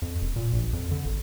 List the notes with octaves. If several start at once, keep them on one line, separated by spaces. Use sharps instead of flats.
F2
E1
A#2
A#1
F2
D3
G#1